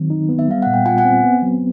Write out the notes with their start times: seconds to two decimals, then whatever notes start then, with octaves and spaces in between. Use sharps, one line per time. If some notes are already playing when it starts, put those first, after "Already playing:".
Already playing: D#3 F#3 C4
0.10 D#4
0.29 B3
0.39 E5
0.48 G3 F5
0.62 A#2 F#5
0.74 G5
0.86 F4 F#5 G#5
0.98 F#5 G#5
1.05 C4
1.23 B3
1.42 F#3